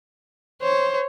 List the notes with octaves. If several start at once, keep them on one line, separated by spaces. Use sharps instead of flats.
C5 C#5